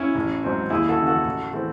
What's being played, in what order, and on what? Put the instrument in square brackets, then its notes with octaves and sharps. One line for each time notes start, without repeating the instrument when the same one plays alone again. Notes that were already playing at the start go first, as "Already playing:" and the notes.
Already playing: [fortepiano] C#4 E4
A1
G#2 F#3 C4
D#2 E4 G#4
F#4 A4
C#3 E3
F#4 A4
A1
E3 A3 C4